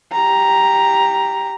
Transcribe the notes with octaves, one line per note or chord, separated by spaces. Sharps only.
G4 A#5